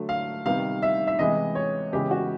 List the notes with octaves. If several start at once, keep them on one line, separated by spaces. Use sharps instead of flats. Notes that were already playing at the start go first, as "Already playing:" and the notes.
Already playing: D3 F#3 A3
F5
C3 D#3 G3 B3 F5
E5
E5
C3 E3 G#3 B3 D#5
C#5
C#3 E3 G#3 B3 G4
F#4